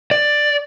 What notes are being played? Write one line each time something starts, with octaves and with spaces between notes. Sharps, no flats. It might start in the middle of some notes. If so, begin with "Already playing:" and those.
D5